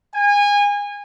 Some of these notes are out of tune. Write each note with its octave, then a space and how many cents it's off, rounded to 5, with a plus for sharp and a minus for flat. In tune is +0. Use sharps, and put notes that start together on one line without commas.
G#5 -25